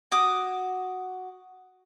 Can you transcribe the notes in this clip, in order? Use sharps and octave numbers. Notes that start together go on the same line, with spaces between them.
F#4 D6 D#6